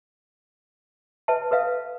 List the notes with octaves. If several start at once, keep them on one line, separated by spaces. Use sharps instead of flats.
B4 E5 A5
A4 B4 E5 F5